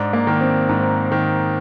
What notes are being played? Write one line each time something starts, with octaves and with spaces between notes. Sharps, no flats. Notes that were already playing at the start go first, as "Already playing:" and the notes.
Already playing: G#2 D4
A#3
D#3
C4
G#2
D#3